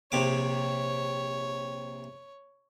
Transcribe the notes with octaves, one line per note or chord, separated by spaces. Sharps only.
A#1 C3 C#5 D6